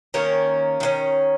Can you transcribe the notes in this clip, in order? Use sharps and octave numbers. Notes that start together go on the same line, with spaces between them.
D#3 A#3 C#4 A#4 C#5
D#3 A#3 C#4